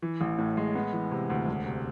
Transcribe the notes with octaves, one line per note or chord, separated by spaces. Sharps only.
E3
A1
A2
G#3
B3
E3
C3
D2
E1
C3